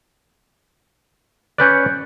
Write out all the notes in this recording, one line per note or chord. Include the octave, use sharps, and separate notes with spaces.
C#4 B4 D5 F#6 G6 C#7